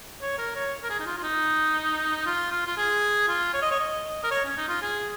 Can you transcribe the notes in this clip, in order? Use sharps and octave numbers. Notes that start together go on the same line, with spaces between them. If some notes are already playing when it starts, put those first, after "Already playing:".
C#5
A#4
C#5
A#4
G#4
D#4
F4
F4
D#4
F4
F4
F4
G#4
F4
C#5
D#5
C#5
D#5
A#4
C#5
C#4
D#4
F4
G#4